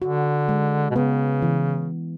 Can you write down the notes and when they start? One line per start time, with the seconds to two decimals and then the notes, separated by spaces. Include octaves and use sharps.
0.02 D3 F#4
0.49 G#3
0.90 B2
0.95 C#3 B3
1.42 E3